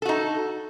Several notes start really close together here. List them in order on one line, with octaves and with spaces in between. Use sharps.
A4 F#4 D#4